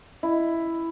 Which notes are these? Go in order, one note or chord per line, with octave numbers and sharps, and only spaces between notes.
E4